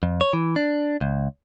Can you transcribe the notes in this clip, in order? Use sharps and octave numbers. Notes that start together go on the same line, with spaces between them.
F2
C#5
E3
D4
C#2